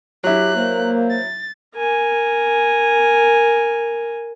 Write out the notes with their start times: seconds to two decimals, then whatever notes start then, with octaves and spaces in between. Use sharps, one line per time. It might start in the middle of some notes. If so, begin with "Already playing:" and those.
0.24 F#3 E4 G4 F#6
0.56 A#3 C5
1.10 A6
1.76 A#4 G#5